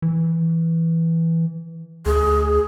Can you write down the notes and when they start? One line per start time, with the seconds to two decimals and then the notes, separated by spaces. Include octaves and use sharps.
0.02 E3
2.06 D2 G#4